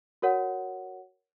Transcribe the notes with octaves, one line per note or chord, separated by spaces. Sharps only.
F#4 A#4 C#5 F#5